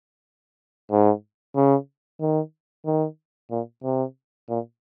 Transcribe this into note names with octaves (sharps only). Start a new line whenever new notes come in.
G#2
C#3
D#3
D#3
A#2
C3
A#2